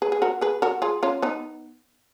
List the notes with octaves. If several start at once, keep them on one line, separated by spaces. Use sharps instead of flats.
G#4 B4
G#4
F#4 A#4
G#4 B4
F#4 A#4
F4 G#4
C#4 F4
B3 D#4